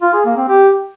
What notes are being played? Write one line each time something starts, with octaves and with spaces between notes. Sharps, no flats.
F4
G#4
A#3
C4
G4